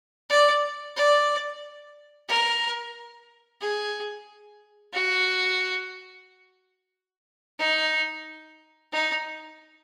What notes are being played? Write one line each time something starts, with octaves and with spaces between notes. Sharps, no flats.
D5
D5
A#4
G#4
F#4
D#4
D#4